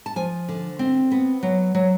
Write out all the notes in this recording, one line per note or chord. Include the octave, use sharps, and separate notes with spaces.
A5
F3 G#5
D3
C4
B3
F#3
F#3